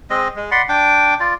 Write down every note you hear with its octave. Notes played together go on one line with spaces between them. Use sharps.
G#3 C4 D#5
G#3
D5 F#5 B5 C6
D4 G5 D6
F4 D5